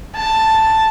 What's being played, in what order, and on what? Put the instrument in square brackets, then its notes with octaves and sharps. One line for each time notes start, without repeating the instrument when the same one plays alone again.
[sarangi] A5